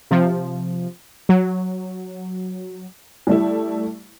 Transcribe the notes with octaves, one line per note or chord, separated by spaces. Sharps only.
C3 F3
F#3
G3 A3 E4